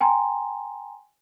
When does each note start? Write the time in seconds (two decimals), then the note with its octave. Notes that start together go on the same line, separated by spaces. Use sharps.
0.01 G5 G#5 A#5 C6